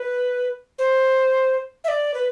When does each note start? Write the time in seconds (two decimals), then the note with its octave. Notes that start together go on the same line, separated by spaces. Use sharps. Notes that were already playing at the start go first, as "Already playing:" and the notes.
Already playing: B4
0.79 C5
1.84 E5
1.88 D5
2.14 B4